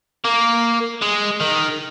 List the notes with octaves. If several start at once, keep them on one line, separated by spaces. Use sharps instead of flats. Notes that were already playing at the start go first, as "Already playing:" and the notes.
A#3
G#3
D#3